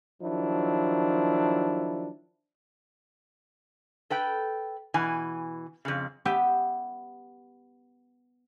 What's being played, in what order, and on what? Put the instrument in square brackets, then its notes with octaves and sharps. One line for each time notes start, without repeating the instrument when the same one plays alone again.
[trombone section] D#3 F3 F#3 D4 E4
[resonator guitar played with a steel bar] A4 B4 G5
B2 E3 G#5
F2 C#3
[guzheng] B3 G4 E5 G5